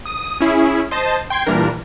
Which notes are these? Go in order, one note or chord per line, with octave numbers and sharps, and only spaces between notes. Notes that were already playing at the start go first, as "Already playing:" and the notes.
D#6
C#4 E4 G#4
C5 D#5 A5
G5 C6 G#6
A#2 E3 G3 D4 A#4